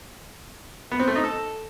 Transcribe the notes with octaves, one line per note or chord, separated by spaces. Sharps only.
B3
C4
A3
D#4
A4